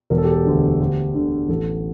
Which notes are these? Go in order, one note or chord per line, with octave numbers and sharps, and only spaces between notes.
E1 A#4
A4
G4
A4
D2 D3
D2 G4
D3
A1 A4